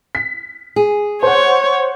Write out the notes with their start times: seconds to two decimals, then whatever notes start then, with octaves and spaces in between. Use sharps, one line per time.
0.15 B6
0.76 G#4
1.23 C5 C#5 F#5